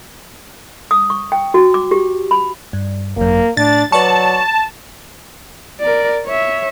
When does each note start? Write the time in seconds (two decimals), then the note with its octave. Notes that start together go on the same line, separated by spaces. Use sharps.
0.91 D#6
1.10 C#6
1.32 G5
1.54 F#4
1.74 D6
1.91 G4
2.31 B5
2.73 G2
3.17 G#1 F#2 A#3
3.57 A2 D4 A6
3.92 F#3 B4 D5 A5 C#6
5.80 A#4 D5
6.26 C#5 E5